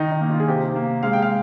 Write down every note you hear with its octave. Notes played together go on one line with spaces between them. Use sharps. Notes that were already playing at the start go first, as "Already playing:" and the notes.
Already playing: D#3 D#4
D#4
A#3
F4
G#4
C3 G4
A#3
G#3 F5
G5
F5